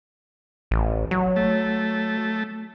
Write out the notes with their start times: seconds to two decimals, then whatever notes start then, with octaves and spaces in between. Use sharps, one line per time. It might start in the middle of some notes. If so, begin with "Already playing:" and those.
0.71 A1
1.11 F#3
1.36 A3